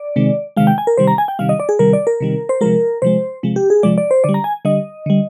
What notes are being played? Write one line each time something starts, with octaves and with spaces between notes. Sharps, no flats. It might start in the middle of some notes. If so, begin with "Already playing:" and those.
Already playing: D5
C3 D#3 G#3
C3 D#3 G#3 F5
G5
G#5
A#4
C3 D#3 G3 C5
A#5
G#5
G5
C3 D#3 G3 F5
D#5
D5
G#4
C3 D#3 G3 A#4
D5
A#4
C3 D#3 G3
C5
C3 F3 G#3 A#4
C3 F3 G#3 C5
C3 F3 G#3
G4
G#4
C3 F3 G#3 D5
D5
C5
D3 G3 D5
A#5
G#5
D3 G3 D#5
D3 G3